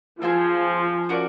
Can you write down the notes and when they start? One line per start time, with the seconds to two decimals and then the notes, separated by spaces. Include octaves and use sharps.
0.21 F3 C4 F4 G#4 C5
1.09 C#4 F#4 A#4 D5